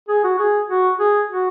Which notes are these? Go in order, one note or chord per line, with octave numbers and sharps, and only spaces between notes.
G#4
F#4
G#4
F#4
G#4
F#4